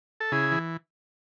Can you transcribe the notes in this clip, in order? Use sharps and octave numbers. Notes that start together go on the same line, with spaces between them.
A4
C#3 E4 G#4
E3